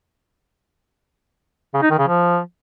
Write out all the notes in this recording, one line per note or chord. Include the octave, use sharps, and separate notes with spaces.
C#3
D#4
D#3
C#3
F3